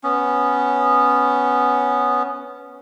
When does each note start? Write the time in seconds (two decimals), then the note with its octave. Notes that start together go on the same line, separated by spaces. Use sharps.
0.03 B3 C#4